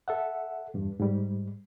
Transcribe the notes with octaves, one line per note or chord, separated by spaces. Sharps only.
A4 E5 F#5
E2 G2
G#2 G3